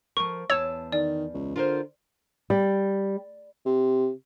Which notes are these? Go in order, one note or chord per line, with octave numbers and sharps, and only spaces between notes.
F3 A#4 C#6
E2 C#5 A5 E6
D#3 D5
C#2
D3 F4 A#4 C5
G3
C3